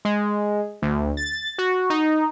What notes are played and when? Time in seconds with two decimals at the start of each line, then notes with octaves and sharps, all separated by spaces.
0.05 G#3
0.82 D2
1.17 A6
1.58 F#4
1.90 D#4